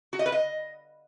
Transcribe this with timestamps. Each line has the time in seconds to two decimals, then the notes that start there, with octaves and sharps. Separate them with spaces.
0.13 F#4
0.19 D#5
0.26 B4
0.32 D#5